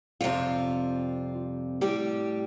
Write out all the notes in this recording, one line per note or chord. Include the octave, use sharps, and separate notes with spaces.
F2 C3 G3 F4
A2 G3 G4